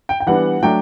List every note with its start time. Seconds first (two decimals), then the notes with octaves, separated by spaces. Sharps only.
0.09 G5
0.20 G5
0.27 E3 G3 B3 D4 F#5
0.63 F#3 A3 D4 G5